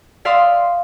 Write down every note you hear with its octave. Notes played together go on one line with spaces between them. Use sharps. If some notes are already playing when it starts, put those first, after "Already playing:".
D5 E5 F5 C6 D#6